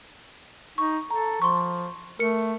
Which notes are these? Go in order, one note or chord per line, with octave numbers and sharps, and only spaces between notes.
D#4 C#6
A4 A#5
F3 C6 C#6
A3 A#4 C#7